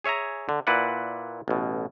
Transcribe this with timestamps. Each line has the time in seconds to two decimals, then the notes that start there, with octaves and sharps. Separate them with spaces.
0.04 G#4 C#5 E5 G#5 A#5
0.49 D3
0.67 A#2 E4 B4 D5 F#5
1.48 A1 B2